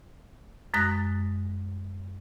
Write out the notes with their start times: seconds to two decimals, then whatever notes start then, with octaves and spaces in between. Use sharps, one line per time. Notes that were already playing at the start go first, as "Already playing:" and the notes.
0.74 F#2 G#3 D#6 F#6 A#6